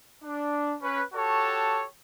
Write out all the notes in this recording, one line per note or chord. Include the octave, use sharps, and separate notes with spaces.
D4
C#4 B4
F#4 G4 A4 C#5 A5